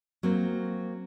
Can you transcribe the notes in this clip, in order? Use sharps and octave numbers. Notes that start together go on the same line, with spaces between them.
F#3 A#3 C4